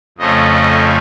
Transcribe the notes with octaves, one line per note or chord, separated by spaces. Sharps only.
F2 C#3 F3 A3 D#5